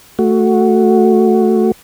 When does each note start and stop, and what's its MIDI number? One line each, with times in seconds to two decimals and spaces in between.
0.19 1.72 57
0.19 1.72 66